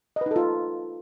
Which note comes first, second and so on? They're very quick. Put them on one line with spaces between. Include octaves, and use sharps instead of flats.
D#5 B4 D#4 A4 F4